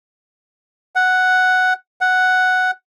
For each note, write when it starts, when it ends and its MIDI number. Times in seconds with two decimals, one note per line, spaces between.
0.95 1.73 78
2.01 2.71 78